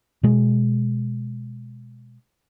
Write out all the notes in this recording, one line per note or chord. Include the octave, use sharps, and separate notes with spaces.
B2 G#3